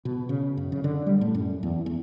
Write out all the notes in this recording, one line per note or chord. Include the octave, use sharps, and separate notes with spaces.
B2
C#3
F#2
C#3
D3
G3
A2
F#2
E2
E2